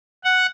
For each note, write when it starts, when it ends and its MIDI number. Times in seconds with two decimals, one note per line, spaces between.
0.25 0.46 78